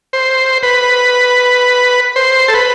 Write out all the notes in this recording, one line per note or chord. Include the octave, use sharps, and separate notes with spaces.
C5
B4
C5
A4
B4